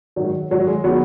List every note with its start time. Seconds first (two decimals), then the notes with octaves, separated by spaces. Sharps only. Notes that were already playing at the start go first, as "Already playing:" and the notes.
0.16 G#2 D#3 F#3
0.50 G#2 D#3 F#3
0.67 G#3
0.84 D#3 F#3 B3